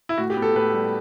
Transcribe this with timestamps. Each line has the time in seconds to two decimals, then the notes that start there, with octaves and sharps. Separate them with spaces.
0.09 E4
0.18 A2 F#4
0.30 G4
0.37 B3
0.42 A4
0.55 A2 B4
0.74 G3